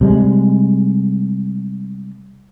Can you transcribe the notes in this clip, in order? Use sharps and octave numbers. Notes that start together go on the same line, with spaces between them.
C3 G3 G#3